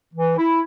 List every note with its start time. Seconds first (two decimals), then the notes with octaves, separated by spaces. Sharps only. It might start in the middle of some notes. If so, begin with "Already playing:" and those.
0.14 E3
0.37 E4